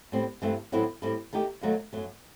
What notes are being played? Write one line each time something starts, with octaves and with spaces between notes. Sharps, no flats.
A2 G3 C4
G2 E3 A3 C4
A2 F#3 A3 C4 E4
A2 G3 C4 E4 A4
D#3 A3 D#4 G4
D#2 D#3 F#3 A3 D#4
F#2 F#3 A3